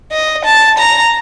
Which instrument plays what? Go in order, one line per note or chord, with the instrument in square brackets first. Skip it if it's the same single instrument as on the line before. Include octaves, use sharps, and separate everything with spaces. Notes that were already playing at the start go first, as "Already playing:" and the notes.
[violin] D#5
A5
A#5